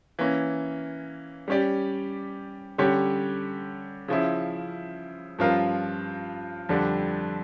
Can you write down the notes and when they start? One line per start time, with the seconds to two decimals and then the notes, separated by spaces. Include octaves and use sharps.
0.19 E3 A#3 C#4
1.48 G3 C#4 G4 D5
2.78 D3 G3 C#4 G4 C#5
4.08 C#3 F3 C#4 E4
5.39 G2 F3 C#4 F4 A#4
6.69 F2 D3 G3 D4